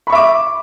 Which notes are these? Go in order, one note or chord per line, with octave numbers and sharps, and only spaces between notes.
E5 B5 C#6 D6